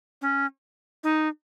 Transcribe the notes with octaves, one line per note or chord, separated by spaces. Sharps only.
C#4
D#4